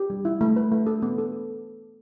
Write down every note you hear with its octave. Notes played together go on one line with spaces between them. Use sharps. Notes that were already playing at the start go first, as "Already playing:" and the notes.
Already playing: G4
G3
E4
A3
B4
A3
A4
B3
A4